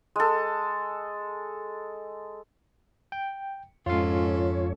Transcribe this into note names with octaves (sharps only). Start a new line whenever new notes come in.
G#3 A4
G5
F2 G#2 C#4 F4 A4 C#5 F5